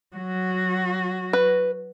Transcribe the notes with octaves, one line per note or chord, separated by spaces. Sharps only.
F#3 F#4
B4